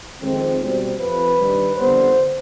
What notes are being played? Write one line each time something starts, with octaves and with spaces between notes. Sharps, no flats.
F2 D#3 G#3 C4
B2 G3 C4
F2 C3 F3 B4
G2 D#3 G3
F2 D3 G3 B3 C5